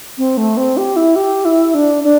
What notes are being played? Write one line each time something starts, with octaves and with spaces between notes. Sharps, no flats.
C4
A3
C4
G4
E4
G4
E4
D4
D4